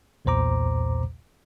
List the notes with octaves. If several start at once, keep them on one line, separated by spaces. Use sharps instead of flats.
B1 E2 A#2 C5 A#5 D6